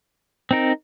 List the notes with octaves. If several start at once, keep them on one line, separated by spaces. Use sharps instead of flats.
C4 D#4 A#4